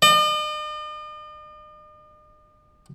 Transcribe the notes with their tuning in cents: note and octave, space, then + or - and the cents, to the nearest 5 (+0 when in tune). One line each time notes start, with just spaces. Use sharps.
D#5 -45